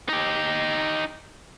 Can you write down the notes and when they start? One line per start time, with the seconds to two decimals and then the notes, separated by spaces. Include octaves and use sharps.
0.09 D#4 G4